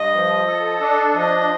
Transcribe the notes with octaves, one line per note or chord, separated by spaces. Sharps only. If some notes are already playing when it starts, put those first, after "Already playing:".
Already playing: G2 D#5
F3
A4
D4
F3 D#5